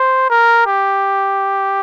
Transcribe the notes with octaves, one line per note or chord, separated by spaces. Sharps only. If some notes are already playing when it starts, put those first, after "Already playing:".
Already playing: C5
A#4
G4